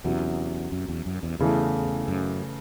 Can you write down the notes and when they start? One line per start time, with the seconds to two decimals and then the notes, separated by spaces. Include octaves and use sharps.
0.04 E2 C3 F#3 C#4 E4
0.72 F#2
0.88 E2
1.06 F#2
1.23 E2
1.39 E2 C#3 E3 A3
2.08 F#2